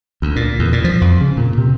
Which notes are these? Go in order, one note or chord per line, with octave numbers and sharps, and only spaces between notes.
D2
A#2
E2
A#2
F3
F2
C#3
A#2
C3